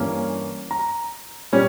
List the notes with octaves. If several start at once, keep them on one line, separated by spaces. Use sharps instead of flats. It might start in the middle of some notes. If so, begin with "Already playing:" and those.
Already playing: G2 E3 A#3 C#4
A#5
A#2 G3 C#4